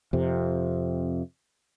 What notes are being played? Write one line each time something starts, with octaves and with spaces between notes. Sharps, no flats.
F2 C3